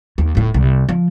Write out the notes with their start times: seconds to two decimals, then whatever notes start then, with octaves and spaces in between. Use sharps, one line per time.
0.18 D#2
0.35 D#1 A2
0.54 C2
0.89 F3